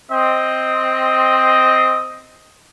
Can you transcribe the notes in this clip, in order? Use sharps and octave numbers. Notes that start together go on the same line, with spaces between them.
C4 D#5